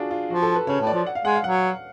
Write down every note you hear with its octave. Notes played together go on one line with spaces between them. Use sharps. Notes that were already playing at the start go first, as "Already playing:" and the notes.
Already playing: D4 F4 F#4 G#4
F4
F3 F#4
A4
B4
C#3 C#5
A2
D5
F3
F#5
F5
G#3 F#5
F5
F#3 F#5